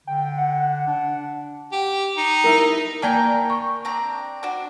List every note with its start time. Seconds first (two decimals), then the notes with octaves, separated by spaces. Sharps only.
0.07 D3 G5
0.38 F#5
0.87 D4
1.72 G4
2.17 D#4
2.44 E4 A#4
3.02 A#3 A#4 D5 G5 A5 A#5
3.50 C#6
3.85 C4 D4 A#5
4.43 D4 F#4